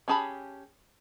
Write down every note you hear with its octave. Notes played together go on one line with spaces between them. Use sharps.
C#4 G4 G#4 A5 B5